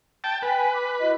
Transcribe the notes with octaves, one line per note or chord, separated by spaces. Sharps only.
G5 A5
B4 G5 G#5
D6
E4 F#4 D#5